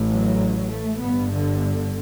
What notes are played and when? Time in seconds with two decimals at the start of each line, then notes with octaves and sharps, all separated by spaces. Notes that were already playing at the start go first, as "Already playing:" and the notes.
Already playing: A1 A2
0.09 F#3
0.69 A3
0.99 G1 G2 B3
1.30 D3